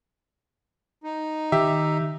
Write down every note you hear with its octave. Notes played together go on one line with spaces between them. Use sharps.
D#4
D#3 G4 E5